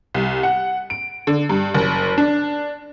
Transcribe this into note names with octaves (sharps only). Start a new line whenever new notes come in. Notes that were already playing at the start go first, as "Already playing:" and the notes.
C2
F#5
D7
D3
G2
F#1
D4